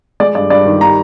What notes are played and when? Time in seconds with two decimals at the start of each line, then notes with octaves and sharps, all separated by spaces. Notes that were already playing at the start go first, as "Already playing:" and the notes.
0.20 G#3 D5
0.35 G2 D5
0.50 G2 D5
0.66 D#3
0.81 G3 A#5